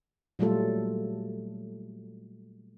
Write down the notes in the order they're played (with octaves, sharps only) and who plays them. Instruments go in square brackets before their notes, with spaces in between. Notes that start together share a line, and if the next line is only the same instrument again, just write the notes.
[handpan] A#2 F#3 G3 A3 F4 A4